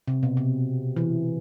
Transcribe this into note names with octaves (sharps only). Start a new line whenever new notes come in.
C3
B2
C3
E3